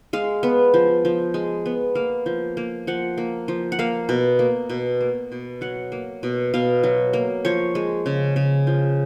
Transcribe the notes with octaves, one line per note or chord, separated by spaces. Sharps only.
G#3 F5
B3
F3
F3
G#3
B3
A#3 F5
F3
A#3
F3 F#5
A#3
F3
F#5
A#3 F5
B2
A#3
B2
A#3
B2
F#3 F#5
A#3
B2
B2 F5
F#3
A#3
F3 C#5
G#3
C#3
C#3
F3